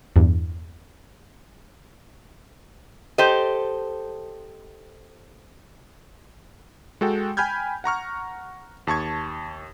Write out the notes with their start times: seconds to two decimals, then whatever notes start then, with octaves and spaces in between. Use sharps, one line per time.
0.16 E2 G2
3.18 G4 A4 C5 D#5
7.01 G#3 F#4 A4 G5
7.37 G5 G#5 B5 F6 G6 G#6
7.84 F#5 A#5 C#6 F6
8.87 D#2 A5 C#6 G#6